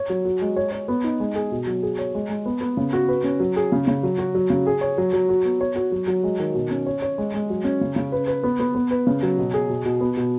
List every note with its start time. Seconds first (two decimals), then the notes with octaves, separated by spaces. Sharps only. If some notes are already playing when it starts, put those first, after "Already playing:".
Already playing: C#5
0.10 F#3
0.25 F#4
0.41 G#3
0.56 C#5
0.72 C#5
0.88 B3
1.04 D#4
1.20 G#3
1.35 G#4
1.52 B2
1.67 F#3
1.83 G#4
1.99 C#5
2.15 G#3
2.29 G#3
2.45 B3
2.61 B3
2.77 C#3
2.93 F#4
3.08 B4
3.24 C#4
3.40 F#3
3.56 G#4
3.72 C#3
3.87 C#3
4.03 F#3
4.18 F#4
4.35 F#3
4.50 C#3
4.66 G#4
4.81 C#5
4.98 F#3
5.13 F#3
5.29 F#4
5.45 B3
5.61 C#5
5.76 F#4
5.92 F#3
6.07 F#3
6.24 G#3
6.40 D#3
6.55 B2
6.71 C#4
6.86 C#5
7.02 C#5
7.18 G#3
7.34 G#3
7.50 F#3
7.64 C#4
7.81 C#3
7.96 C#3
8.12 B4
8.28 B4
8.44 B3
8.59 B3
8.75 B3
8.91 B4
9.07 C#3
9.23 F#3
9.38 B2
9.54 G#4
9.69 B2
9.85 B2
10.01 B3
10.17 B2